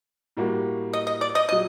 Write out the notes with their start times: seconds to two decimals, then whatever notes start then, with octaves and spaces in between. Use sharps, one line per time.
0.37 A2 G3 A#3 F#4
0.93 D#5
1.07 D#5
1.21 D5
1.35 D#5
1.49 A#2 F#3 D#5